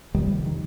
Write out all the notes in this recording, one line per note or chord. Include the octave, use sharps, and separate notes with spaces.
F2 C3 D#3 G3
D#3